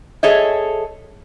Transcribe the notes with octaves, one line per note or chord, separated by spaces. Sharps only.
G#4 A4 C#5 D#5 E5